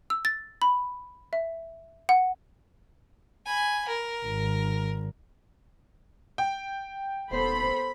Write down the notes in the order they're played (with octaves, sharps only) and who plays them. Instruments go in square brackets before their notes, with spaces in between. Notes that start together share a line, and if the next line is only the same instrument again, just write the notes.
[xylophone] E6
A6
B5
E5
F#5
[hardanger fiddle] G#5 B5
A#4
[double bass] G#1
[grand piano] G5
[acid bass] D#1 [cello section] B3 A4 C5 [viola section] B5